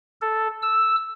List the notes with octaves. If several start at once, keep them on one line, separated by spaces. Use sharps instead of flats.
A4
E6